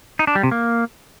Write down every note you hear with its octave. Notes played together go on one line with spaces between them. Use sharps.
D#4
D4
G3
C3
A#3